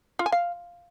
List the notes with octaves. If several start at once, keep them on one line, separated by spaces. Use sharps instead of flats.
F4
G#5
F5